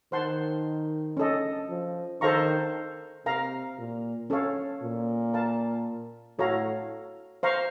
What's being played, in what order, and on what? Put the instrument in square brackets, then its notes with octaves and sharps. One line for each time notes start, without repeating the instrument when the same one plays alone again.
[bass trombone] D#3 [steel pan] C5 F#5 A5 C6
[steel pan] C#4 A4 D#5
[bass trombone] F3
[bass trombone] D#3 [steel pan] A4 C5 F5 A#5 C#6
[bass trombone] C3 [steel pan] A#4 F5 A#5
[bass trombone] A#2
[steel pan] C#4 A4 C#5 F5
[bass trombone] A#2
[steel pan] A#4 F5 A5
[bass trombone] A2 [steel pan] F#4 A4 C#5 F5 A#5
[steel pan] C5 F5 A#5 C#6